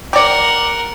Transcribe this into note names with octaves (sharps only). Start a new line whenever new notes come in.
G4 A#4 D5 F#5